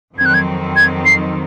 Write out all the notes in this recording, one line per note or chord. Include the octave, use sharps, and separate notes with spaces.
F2 D#3 F#3 C4 G#6
F#6
G#6
G#6
C7